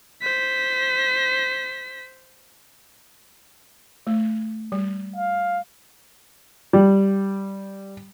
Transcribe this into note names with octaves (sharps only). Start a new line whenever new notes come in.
C5 B6
A3
G3
F5
G3